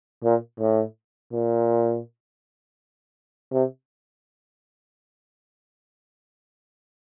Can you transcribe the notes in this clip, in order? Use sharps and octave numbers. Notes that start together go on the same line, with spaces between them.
A#2
A2
A#2
C3